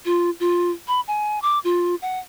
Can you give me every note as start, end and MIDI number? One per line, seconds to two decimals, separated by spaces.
0.05 0.30 65
0.40 0.71 65
0.88 1.01 83
1.08 1.41 80
1.42 1.59 86
1.64 1.95 65
2.02 2.19 78